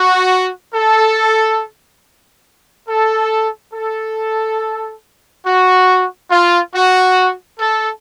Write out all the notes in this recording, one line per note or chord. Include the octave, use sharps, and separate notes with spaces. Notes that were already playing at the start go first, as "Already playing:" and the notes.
Already playing: F#4
A4
A4
A4
F#4
F4
F#4
A4